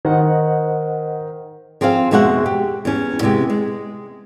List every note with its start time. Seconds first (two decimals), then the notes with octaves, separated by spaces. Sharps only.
0.05 D#3 C5 D#5 F#5
1.81 F3 C4 G#4 C5 F5
2.11 F2 B2 G#3 F#4 E5 F#5
2.46 G4
2.85 E2 C#4
3.22 C3 G#3 B3 G4
3.50 G#3